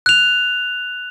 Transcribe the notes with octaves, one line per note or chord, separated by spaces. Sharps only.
F#6 F7